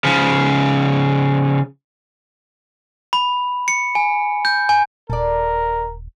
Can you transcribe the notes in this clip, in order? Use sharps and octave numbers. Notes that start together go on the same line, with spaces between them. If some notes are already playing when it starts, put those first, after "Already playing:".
C#3 F3
B5
C#7
G#5
G6
G#5
D#1 A4 A#4 D5